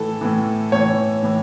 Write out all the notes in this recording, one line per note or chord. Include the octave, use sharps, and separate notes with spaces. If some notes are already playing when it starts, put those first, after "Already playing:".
Already playing: A2 E3 A4
A2 E3
A2 E3 C#5
A2 E3